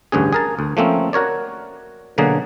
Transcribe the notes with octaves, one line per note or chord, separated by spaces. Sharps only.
A1 D2 G2 C#4 G#4
G#4 A#4 A5
D2
F3 A3 A#3 C4 C#4
F#4 A#4 C#5 D5
B2 D3 F#3 A#3 G#4